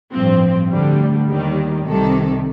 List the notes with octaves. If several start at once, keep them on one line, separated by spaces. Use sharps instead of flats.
A1 G2 F3 C4
D2 D3 G3
D#2 D#3 G3
C2 C3 D#3 G3 A4